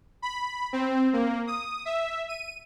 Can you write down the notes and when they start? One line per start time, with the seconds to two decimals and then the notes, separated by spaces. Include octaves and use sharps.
0.22 B5
0.73 C4
1.13 A#3
1.47 D#6
1.85 E5
2.29 D#7